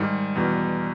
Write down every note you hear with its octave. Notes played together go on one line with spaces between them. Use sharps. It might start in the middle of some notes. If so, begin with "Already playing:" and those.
Already playing: G#2 D#3 G3
E2 B2 G3